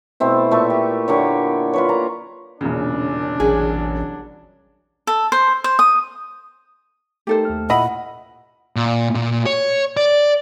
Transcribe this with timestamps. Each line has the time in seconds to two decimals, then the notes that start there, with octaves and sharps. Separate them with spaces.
0.20 B2 A3 C4 E4
0.51 A#2 A3 B5 C#6
0.70 G4
1.08 D3 A#3 G4 C#5
1.73 F4 B4 C#5
1.89 A#3 A#5
2.61 E1 C2 A#2 C#3 C#4 D4
3.40 A1 F#3 G#4
5.07 A4
5.32 C5
5.64 C5
5.79 D#6
7.27 A3 D#4 G4 A4 A#4 C5
7.45 D#2 A3 F6
7.70 A#2 E4 D#5 F#5 B5
8.76 A#2
9.15 A#2
9.46 C#5
9.97 D5